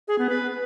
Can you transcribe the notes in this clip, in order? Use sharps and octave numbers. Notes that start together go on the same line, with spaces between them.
G#4
B3
B4